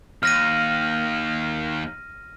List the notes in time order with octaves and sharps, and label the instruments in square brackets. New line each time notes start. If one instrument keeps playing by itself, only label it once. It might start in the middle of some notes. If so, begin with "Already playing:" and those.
[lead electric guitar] D#2 [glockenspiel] F6 A#6 D#7